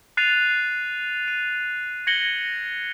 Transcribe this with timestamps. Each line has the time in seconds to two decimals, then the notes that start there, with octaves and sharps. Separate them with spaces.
0.17 F#6 A6 C7 D#7 F7
1.28 D#7
2.07 G#6 A#6 C#7 F#7 G7